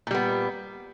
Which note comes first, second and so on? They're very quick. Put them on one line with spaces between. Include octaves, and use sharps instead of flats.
A#2 G3 B3